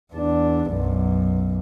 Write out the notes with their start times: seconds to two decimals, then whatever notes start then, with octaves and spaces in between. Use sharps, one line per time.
0.14 E2 D4
0.71 B1 F#2